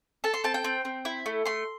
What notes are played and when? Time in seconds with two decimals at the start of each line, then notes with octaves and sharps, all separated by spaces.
0.24 A4 A5
0.34 C6
0.44 C4 A5
0.54 G5
0.64 C4
0.85 C4
1.05 E4
1.26 A3
1.45 A3 C6